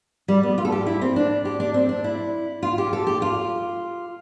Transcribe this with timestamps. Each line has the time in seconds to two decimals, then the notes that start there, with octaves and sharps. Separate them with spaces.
0.28 G3
0.43 B3
0.58 F4
0.65 A4
0.72 G4
0.86 E4
1.02 C4
1.16 D4
1.45 G4
1.60 D4
1.74 C4
1.89 D4
2.04 E4
2.63 F4
2.78 G4
2.93 A4
3.07 G4
3.22 F4